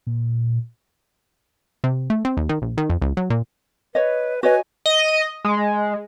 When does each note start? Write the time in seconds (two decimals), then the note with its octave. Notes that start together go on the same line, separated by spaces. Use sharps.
0.07 A#2
1.84 C3
2.10 A3
2.25 C4
2.37 D#2
2.49 D#3
2.62 A#1
2.78 D#3
2.90 F2
3.02 C#2
3.17 F#3
3.30 A#2
3.95 B4 C#5 D#5
4.43 F#4 B4 C#5 D#5 G#5
4.86 D#5
5.45 G#3